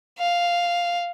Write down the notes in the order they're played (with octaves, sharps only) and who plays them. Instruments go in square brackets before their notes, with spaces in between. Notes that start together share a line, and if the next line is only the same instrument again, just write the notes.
[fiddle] F5